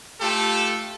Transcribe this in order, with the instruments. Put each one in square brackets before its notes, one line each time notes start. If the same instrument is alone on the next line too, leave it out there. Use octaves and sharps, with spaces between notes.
[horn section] A3 F4 G4 A4